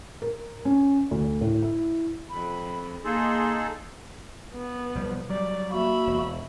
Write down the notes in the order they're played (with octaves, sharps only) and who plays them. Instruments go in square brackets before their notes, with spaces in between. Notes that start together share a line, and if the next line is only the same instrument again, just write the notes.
[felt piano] A#4
C#4
D2
A2
E4
[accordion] F2 [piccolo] B5
[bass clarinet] A#3 [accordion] D#4 G#4 A4 [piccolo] C6
[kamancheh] B3
[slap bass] B1 F3 G3
[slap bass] F#3 G3 [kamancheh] D5
[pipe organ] A#3 F#4 [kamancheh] E5 B5
[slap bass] E1